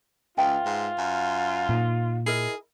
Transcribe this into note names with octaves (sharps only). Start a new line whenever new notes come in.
C#2 F4 B4 E5 G5
G#2
F#2
A#2 C#4 D#4
E4 G#4 A#4 D#5